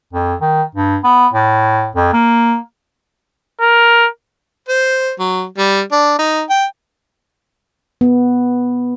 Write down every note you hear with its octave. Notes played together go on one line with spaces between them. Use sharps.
F2
D#3
G2
B3
A2
F2
A#3
A#4
C5
F#3
G3
D4
D#4
G5
B3